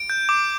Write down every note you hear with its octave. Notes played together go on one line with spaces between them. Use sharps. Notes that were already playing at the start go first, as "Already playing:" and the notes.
Already playing: D7
G6
D6